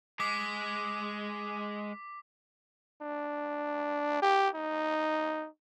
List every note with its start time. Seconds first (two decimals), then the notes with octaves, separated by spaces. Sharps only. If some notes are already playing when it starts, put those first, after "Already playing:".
0.20 G#3 D6 B6
3.02 D4
4.22 G4
4.55 D#4